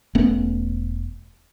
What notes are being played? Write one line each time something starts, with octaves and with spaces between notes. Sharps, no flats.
E1 A3 B3 C#4